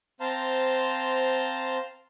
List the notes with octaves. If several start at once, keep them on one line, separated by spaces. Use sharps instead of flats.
C4 C5 F5 A5 A#5 C6